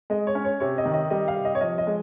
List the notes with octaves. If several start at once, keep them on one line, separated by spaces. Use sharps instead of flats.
G#3 D#5
C#5
C#4
C#5
C3 C#5
D#5
D#3
D#5
G3 D#5
F5
C3
D#5
C#5
F3 D#5
D#5
G#3